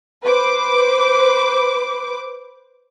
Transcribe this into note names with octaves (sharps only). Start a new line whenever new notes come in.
B4 C5 D6